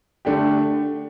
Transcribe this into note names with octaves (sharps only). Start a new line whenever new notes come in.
D3 A3 D4 G4